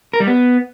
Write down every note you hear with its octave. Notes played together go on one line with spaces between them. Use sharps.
A#4
G3
B3